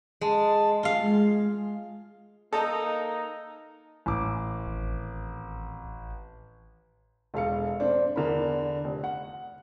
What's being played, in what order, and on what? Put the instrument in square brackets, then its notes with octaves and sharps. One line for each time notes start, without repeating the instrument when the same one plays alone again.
[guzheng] G#3 [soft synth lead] A5
[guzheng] F4 F5
[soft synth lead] G#3
[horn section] A#3 D#4 [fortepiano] A4 D#5
[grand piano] A1 D6
[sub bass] G#1
[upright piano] E1 A4 F5 C#7
C4 D4
E2 D3 A#4 B5
F1
F#5